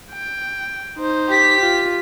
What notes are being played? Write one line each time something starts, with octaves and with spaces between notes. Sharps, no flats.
G5
D#4 C5
G4 B6
F4